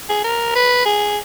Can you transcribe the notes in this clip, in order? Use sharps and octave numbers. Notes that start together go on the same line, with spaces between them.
G#4
A#4
B4
G#4